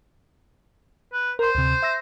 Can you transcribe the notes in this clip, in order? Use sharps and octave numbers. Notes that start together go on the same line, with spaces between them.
B4
A#4 C5 C6
D2 C3
E5 E6 A#6